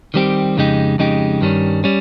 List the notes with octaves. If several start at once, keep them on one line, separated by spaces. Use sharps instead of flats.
D#3 G3 C4 G4
F2 C#3 G#3 D#4 G4
F2 C#3 G#3 D#4 G4
G2 D#3 G3 C#4
G3 C#4